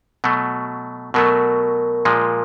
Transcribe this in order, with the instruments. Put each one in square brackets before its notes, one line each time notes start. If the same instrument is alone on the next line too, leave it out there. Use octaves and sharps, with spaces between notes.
[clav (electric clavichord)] B2 F#3 A3
[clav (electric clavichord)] B2 F#3 A3 [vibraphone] A#4
[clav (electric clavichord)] A#2 F3 G#3